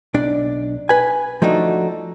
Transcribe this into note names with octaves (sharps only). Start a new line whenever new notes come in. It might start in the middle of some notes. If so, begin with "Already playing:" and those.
B1 D4 D5
B4 G#5
F3 A3 D4 D#4 F#4